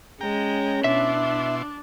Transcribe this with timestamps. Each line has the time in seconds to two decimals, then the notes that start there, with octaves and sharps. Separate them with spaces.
0.21 G#3 C#4 G5 A#5
0.84 B2 D4 E4 E5 C6